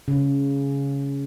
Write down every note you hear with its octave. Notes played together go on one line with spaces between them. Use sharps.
C#3